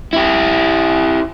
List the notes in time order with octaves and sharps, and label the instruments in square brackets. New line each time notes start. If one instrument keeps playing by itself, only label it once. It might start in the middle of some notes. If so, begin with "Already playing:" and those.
[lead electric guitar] E4 G4